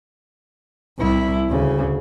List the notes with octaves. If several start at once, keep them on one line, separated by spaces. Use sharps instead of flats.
C2 E4
D2 C#3